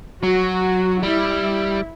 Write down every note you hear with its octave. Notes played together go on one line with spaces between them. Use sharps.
F#3 F#4
G3 E4